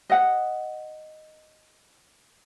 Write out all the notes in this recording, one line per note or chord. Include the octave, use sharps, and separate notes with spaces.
D#5 F#5